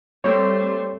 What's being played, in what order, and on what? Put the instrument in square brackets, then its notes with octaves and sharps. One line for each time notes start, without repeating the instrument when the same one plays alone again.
[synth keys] G3 C4 G4 [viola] A3 C6 [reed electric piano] C#5